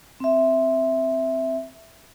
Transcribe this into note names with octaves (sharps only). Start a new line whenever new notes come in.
C4 E5